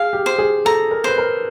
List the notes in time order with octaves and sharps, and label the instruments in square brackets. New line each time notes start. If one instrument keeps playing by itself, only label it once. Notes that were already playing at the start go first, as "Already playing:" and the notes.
Already playing: [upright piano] G#4 [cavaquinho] F5
[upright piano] G4
[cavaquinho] C5
[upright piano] G#4
[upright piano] A4 [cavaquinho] A#5
[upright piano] A#4
[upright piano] B4 [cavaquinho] C5
[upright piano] A#4